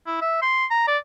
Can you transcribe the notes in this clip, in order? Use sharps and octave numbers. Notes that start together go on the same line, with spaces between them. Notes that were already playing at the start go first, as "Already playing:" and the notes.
E4
E5
C6
A#5
D5